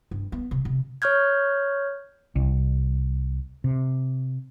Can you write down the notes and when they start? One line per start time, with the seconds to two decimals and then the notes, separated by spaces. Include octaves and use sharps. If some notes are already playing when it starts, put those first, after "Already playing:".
0.11 G2
0.32 B3
0.51 C3
0.65 C3
1.02 C#5 C#6 F6 G6 G#6
2.36 C2
3.64 C3